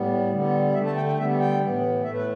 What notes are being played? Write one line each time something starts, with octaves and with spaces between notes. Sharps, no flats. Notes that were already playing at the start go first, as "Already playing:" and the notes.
Already playing: A2 G3 B3
D3 G3 B3
D3 A3 E5
A5
G5
G5
D3 G3 B3 E5
G5
A2 E3 B3
A2 A3 E5
B4